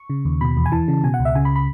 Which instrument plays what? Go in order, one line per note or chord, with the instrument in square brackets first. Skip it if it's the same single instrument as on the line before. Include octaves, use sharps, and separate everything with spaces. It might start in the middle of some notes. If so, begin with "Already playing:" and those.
Already playing: [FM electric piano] C#6
C#3
D#2
B2 B5
E2
G#5
E3 A5
C#3
B2 G#5
F#5
C#2
E5
C#3 G#5
B5
B5